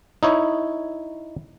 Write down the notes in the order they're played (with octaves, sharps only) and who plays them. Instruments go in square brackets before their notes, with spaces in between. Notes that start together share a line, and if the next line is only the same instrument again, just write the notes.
[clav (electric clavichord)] D#4 E4 C#5